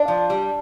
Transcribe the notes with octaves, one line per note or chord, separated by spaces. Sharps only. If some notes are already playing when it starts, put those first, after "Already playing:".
Already playing: D4
F3
G3